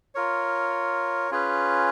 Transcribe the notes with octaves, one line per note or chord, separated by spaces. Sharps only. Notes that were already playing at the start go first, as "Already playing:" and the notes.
F4 A#4 C#5
C#4 F4 G#4 B4